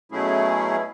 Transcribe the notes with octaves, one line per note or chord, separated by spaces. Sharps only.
B2 F#3 A3 C#4 E4 G#4